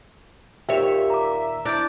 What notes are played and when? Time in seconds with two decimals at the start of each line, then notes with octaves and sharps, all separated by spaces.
0.69 D#2 A#2 G4 C#5 E5 G5
1.10 A#5 D6
1.65 D4 E4 G6 A6 D7